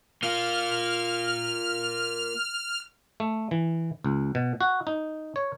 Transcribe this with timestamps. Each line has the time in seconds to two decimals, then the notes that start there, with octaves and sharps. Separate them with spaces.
0.23 A#3 F4 F6
3.20 A3
3.51 E3
4.04 C#2
4.35 B2
4.61 F#4
4.87 D#4
5.36 C#5